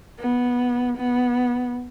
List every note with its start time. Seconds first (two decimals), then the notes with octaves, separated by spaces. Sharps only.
0.19 B3
0.97 B3